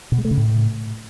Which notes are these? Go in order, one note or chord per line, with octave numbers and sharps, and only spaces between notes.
B2
G#3
A3
C#3
A2